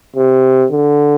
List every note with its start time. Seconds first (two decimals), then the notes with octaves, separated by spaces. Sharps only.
0.16 C3
0.71 D3